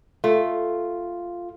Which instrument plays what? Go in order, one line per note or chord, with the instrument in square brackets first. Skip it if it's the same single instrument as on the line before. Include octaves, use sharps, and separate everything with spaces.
[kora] A3 [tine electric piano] F4